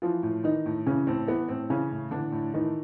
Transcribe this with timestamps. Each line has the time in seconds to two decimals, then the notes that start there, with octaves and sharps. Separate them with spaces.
0.02 E3 F3 F4
0.23 A2
0.44 D#3 E3 D#4
0.66 A2
0.87 C#3 E3 C#4
1.07 A2 C4
1.27 E3 B3
1.48 A2 C4
1.70 C#3 E3 C#4
1.91 A2
2.11 D3 E3 D4
2.32 A2
2.54 D#3 E3 D#4